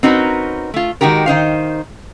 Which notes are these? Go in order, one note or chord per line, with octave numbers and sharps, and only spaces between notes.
C4 C#4 D#4 F#4 A#4 B4
A3 F4
D#3 G#3 F#4 G4 A#4
D#3 D#4 C5 F5